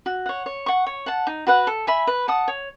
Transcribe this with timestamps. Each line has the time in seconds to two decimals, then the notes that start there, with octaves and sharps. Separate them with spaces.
0.06 F#4
0.26 C#5 F#5
0.46 C#5
0.66 F#5 C#6
0.87 C#5
1.06 F#5 A5
1.27 D#4
1.47 F#4 B4 F#5
1.67 A4
1.87 E5 G#5 B5
2.07 B4
2.28 F#5 A5 D#6
2.48 C#5